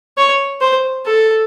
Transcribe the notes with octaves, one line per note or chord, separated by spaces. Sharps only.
C#5
C5
A4